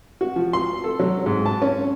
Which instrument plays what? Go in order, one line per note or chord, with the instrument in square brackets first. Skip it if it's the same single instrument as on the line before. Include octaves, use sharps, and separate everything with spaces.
[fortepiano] F#4
F3
C6
A4
F#3
G#2
A5
C#4